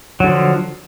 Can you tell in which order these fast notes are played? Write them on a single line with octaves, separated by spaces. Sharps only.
F#3 D3 F3